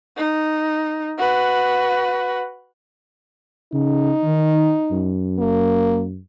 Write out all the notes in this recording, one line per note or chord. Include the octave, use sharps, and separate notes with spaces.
D#4
F#4 B4
C#3 D#4
D#3
F#2
A#3